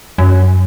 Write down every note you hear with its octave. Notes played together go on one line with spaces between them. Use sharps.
F#2